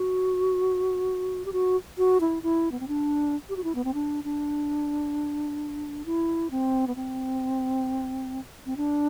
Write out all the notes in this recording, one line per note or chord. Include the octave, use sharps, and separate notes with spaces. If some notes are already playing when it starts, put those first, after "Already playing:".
Already playing: F#4
G4
F#4
F#4
E4
E4
B3
C4
D4
G4
F#4
E4
B3
C4
D4
D4
E4
C4
B3
C4
C4
D4